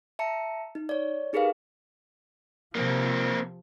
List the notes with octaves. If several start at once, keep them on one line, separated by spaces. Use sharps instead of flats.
E5 A5 A#5 C#7
D#4
C#5 D5
D#4 G4 G#4 A#4 B4 F5
C3 F3 A#3 C4